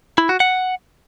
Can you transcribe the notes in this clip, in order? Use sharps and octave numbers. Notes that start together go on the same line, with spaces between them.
E4
F#4
F#5